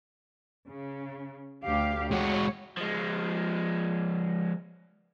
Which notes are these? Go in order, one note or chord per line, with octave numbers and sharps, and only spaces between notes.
C#3
D2 G4 F5
G#3 F#4 C#5
F3 G#3